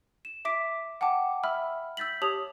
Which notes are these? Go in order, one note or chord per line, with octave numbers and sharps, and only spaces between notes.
E7
E5 D6 B6 D7
F#5 G5 A5 D6
E5 B5 E6 F6
E6 G6 A6 B6 F#7
G4 C#5 A5 D#6 F7 F#7